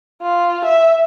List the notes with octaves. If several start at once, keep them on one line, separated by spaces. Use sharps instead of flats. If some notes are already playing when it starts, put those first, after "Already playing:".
F4
E5